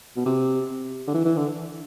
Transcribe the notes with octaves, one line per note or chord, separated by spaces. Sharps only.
B2
C3
D3
E3
E3
D3